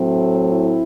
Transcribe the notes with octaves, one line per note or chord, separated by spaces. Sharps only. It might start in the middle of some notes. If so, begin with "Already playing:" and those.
Already playing: A2 F#3 A3 C4
E4